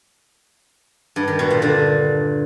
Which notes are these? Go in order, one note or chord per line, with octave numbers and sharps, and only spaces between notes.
G2
D#3
B2
A#2
D3